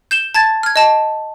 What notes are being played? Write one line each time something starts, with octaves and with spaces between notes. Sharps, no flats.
G6 E7 G7
A5 G#6 A6
F6 G#6
D#5 A5